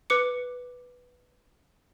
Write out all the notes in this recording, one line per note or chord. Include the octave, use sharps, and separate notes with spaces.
B4 D6 C#7